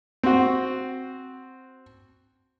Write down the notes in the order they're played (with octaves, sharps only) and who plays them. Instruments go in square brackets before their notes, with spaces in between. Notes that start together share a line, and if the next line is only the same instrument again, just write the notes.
[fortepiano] C4 F#4